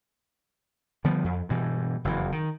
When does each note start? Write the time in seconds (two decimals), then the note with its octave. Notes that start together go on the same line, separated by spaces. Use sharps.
1.04 D3 F3 G3 B3
1.24 F2
1.49 G2 B2 E3
2.05 F#1 F2 B2 E3
2.32 D#3